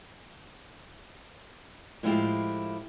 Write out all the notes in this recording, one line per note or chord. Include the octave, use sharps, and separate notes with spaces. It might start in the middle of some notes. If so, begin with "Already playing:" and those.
A2 F3 G#3 E4 F4 G4